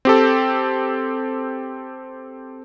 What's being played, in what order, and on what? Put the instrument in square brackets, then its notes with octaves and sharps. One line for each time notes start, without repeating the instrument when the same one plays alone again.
[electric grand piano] C4 G4 A4